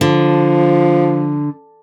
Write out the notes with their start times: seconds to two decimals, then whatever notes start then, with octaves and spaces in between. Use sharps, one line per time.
0.01 D3 F3